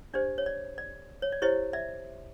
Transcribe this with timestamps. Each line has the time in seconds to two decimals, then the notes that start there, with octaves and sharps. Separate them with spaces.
0.14 D4 G4 C5 D5
0.38 C#5
0.46 D5
0.78 D5
1.22 C#5
1.32 D5
1.42 E4 G4 C5 C#5 D#5
1.73 D5 E5